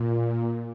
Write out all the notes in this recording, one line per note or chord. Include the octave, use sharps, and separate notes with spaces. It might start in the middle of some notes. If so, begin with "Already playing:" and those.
Already playing: A#2